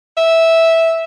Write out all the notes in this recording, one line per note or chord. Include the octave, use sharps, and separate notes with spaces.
E5